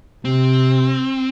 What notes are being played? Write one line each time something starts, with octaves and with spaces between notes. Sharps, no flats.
C3 C4